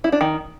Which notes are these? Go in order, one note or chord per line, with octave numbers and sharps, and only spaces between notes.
E4
D4
D#3